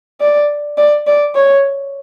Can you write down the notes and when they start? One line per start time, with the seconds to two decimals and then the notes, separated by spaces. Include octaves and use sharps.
0.21 D5
0.78 D5
1.07 D5
1.35 C#5